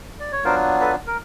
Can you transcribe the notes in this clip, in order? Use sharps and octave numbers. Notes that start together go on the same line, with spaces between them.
D5
C#5
F#3 B3 D4 F4 A#4 C5
A4 B4
A#4